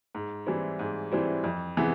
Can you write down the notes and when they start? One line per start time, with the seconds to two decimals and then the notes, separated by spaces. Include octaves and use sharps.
0.15 G#2
0.46 E3 G3 C4 E4
0.79 G#2
1.12 E3 G3 C4 E4
1.44 F2
1.77 C3 E3 G#3 B3